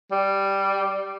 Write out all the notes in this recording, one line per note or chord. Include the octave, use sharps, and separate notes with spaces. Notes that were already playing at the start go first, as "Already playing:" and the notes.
G3